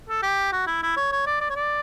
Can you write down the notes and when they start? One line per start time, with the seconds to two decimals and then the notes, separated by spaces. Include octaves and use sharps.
0.09 A4
0.23 G4
0.52 F#4
0.67 E4
0.83 E4
0.97 C#5
1.12 C#5
1.27 D5
1.41 D5
1.50 C#5
1.56 D5